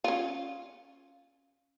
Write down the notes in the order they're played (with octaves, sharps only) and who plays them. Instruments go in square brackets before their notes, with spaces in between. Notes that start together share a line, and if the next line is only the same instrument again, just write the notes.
[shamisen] C#4 F4